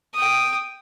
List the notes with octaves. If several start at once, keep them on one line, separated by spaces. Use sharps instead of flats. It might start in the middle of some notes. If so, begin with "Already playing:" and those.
G5 D#6